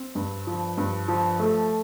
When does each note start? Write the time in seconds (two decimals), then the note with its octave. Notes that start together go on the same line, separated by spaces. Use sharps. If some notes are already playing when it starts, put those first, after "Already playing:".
Already playing: C4
0.15 G2
0.47 F3
0.77 G2
1.08 F3
1.39 A3